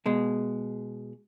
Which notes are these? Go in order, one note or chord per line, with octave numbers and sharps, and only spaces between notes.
B2 G#3